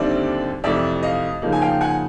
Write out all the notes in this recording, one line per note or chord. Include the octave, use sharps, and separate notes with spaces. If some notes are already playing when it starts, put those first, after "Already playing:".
Already playing: D#2 D3 G3 C4 D5 E5
F2 C3 E3 A3 D5 E5
D#5 F5
C#3 F3 A#3 D#4
G#5
F5 G5
F#5 G#5